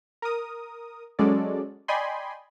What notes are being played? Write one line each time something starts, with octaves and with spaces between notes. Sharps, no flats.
A#4 D#6
F#3 G#3 C#4 F#4 A4 D5
D5 D#5 G5 G#5 B5 C6